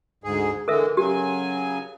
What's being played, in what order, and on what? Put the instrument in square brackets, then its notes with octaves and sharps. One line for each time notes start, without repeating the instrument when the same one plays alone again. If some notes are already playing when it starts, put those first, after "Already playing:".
[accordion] D2 G#2 G#4
[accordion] D3 E3 G#3 [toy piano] A4 A#4 E5
[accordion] C#3 F#3 G#5 [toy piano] G4